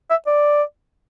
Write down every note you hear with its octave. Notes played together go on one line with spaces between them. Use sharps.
E5
D5